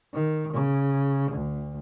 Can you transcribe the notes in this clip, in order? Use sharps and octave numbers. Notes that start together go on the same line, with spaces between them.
D#3
C#3
D2